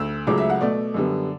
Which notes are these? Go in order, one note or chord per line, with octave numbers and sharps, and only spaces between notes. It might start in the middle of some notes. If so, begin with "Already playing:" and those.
Already playing: D2 E6
C#2 C#3 F#3 A3 D6
E5
F#5
B2 A3 D5
F#2 D3 G3 B3